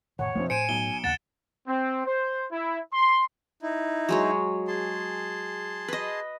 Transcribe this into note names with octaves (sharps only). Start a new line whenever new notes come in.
E1 A2 D#3 C#5 F#5
E1 F3 C4
A2 C5 G#5 C#7 D7 E7
B1 G7
D#2 C#3 A#3 F#5 A6 E7
C4
C5
E4
C6
D#4 E4
F#3 G#3 C#5
G#4 A5 C6
B4 D#5